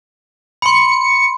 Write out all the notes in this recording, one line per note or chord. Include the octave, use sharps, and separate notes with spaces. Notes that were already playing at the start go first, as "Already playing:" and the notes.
B5 C6 C#7